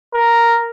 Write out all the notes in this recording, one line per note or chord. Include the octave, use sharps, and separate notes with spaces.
A#4